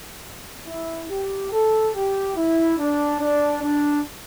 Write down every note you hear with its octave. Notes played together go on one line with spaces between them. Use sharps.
E4
G4
A4
G4
E4
D4
D4
D4